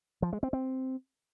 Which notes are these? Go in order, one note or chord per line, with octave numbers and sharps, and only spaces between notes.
F3
G#3
C4
C4